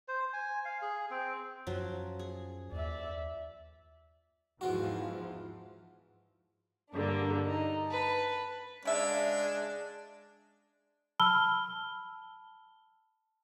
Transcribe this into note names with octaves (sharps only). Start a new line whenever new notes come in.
C5
G#5
F5
G#4
C4
F#2 F3 F#3
G#4
D#2 D5 E5
E2 G#2 E3 F3 F4 F#4
G2 D3 A#3 D4
D#4
B4 A5
C#3 G#3 D4 E5 F5
A5 B5 E6 F6 G7